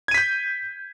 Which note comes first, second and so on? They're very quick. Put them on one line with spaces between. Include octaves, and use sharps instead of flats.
G#6 D#7 B6 G6